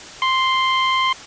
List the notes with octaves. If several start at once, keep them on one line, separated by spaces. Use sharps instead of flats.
C6